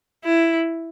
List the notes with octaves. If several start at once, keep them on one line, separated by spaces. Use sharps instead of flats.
E4